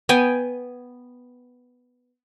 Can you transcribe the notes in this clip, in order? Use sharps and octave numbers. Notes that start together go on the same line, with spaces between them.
B3 G5 G#5